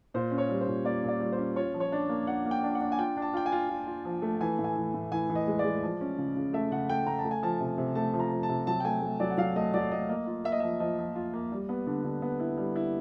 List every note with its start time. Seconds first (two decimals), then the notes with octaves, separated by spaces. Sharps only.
0.14 A#2 C5
0.31 C#4
0.38 C#5
0.49 G3
0.61 C5
0.67 A#2
0.85 A#3 D5
1.03 A#2
1.09 D5
1.20 G3
1.32 C5
1.38 C#4
1.56 F4 C#5
1.74 F3
1.80 C#5
1.92 D4
2.09 A#3
2.27 D4 F#5
2.45 A#3
2.51 G5
2.63 D4
2.75 F#5
2.81 D4
2.92 G#5
2.98 F4 G5
3.17 D4
3.22 A5
3.34 F4 G5
3.46 G#5
3.52 F4
3.69 F4
3.87 F4
4.05 F3
4.22 A3
4.40 E3 G#5
4.59 A2
4.64 G#5
4.76 E3
4.94 A2
5.11 E3 G#5
5.30 E3
5.35 D#5
5.48 G#3
5.59 D5
5.65 G#3
5.83 F3
6.01 C#4
6.18 C#3
6.36 C#3
6.53 A3 E5
6.72 C#3 F#5
6.90 A3 G5
7.07 C#3 A#5
7.19 A5
7.25 A3
7.31 G#5
7.43 F3 A5
7.60 C3
7.78 C3
7.95 A3 A5
8.13 F3
8.20 A#5
8.32 F3
8.43 A5
8.49 C3
8.67 F#3 A5
8.80 G5
8.85 A3 G#5
9.02 A3
9.20 F#3 D5
9.30 F#5
9.38 F#3 F5
9.56 A3 D#5
9.74 F#3 D5
9.91 A3 D#5
10.09 A#3 D#5
10.27 F4
10.45 A#3 E5
10.52 D#5
10.60 F3 E5
10.80 F3 D#5
10.99 F3
11.15 F4
11.34 A#3
11.52 G3
11.69 B3
11.87 D3
12.05 D3
12.22 B3
12.40 E4
12.57 G3
12.76 E4